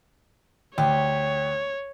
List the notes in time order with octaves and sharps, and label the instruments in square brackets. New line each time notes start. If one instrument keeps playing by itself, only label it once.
[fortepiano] D2 [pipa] G4 [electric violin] C#5